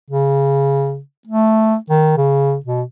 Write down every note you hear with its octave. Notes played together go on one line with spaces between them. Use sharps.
C#3
A3
D#3
C#3
B2